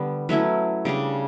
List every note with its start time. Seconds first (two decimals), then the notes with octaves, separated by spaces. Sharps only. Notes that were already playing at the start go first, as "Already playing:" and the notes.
Already playing: D3 G3 B3 D4
0.29 F#3 A3 C#4 E4 B4
0.85 C#3 G3 D4